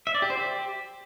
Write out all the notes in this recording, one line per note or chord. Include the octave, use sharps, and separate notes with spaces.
E5
D5
G4
C5
G4